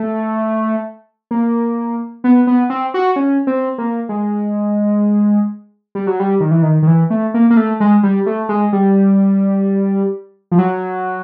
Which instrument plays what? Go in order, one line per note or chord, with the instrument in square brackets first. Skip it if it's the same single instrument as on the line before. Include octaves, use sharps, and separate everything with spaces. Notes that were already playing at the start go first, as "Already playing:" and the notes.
Already playing: [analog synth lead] A3
A#3
B3
B3
C4
F#4
C#4
C4
A#3
G#3
G3
F#3
G3
D#3
E3
D#3
D#3
E3
A3
A#3
A#3
A3
G#3
G3
A3
G#3
G3
F3
F#3